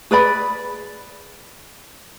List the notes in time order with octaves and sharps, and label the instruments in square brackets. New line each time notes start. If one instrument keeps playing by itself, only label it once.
[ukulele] G#4 B4 D5 B5